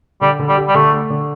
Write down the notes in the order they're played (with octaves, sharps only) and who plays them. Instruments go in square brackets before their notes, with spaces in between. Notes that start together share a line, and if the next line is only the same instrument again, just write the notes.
[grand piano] D3 [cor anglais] G3
[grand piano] D3
[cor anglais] G3
[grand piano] G4
[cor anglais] G3
[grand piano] D3 [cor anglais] A3
[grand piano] A3
D3